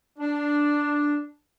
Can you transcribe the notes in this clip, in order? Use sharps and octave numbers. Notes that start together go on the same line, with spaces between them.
D4